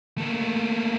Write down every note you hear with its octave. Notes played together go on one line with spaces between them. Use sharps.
A3 A#3